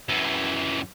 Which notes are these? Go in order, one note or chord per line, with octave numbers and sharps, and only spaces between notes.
F#2 E3